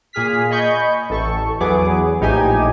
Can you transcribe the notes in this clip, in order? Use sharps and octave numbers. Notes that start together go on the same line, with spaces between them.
A#2 G#4 F6 B6
D#5 G#5 B5 C#6 G6
A1 A4 C#6
E2 F#3 B3 G#4 D6
A#1 A2 D#4 G4 G#5